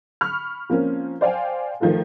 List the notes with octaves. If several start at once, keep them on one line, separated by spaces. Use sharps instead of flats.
B5 C#6 F6
F3 A#3 C4 C#4
C5 D5 F5 G5 G#5
D#3 F3 A3 F4 A4